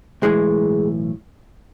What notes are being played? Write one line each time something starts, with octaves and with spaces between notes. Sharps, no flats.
B1 A2 E3 G#3